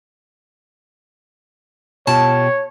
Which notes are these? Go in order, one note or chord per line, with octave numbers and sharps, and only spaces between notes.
B2 F4 G4 C#5 A5